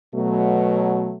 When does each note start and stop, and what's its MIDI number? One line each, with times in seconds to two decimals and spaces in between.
0.15 1.14 47
0.15 1.14 54
0.15 1.14 57